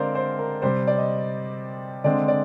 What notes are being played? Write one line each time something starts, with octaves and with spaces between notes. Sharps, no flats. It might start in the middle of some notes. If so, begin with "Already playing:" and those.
Already playing: D3 G#3 C4 A#4 C5 D5 F5
C5
A#4
C3 G3 C4 C5
D5
D#5
D3 G#3 C4 D5
D5